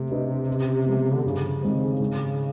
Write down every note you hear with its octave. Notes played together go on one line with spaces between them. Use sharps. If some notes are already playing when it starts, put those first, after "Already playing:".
Already playing: C3 A3
D4 G4 B4 D#5
C#3
F3 G#3 B3
D3
G2 C#3
D#3 G#3 C4
G#2